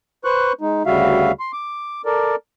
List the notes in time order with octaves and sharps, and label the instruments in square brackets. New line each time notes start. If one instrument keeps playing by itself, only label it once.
[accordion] B4 C5 C#6 F#6
G#3 D#4
D2 C#3 G3 F#4 E5 F5
C6
D6
A4 A#4 D5